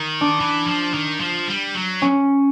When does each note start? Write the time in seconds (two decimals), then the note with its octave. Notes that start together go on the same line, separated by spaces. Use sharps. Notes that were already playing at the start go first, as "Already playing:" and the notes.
Already playing: D#3
0.21 D4
0.40 E3
0.67 F3
0.94 D#3
1.20 F3
1.48 G3
1.75 F#3
2.02 C#4